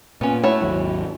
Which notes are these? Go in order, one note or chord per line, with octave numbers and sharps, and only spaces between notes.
A#2 B3 C#4
A3 E4 F#4 C#5
G#1 D#2 F#3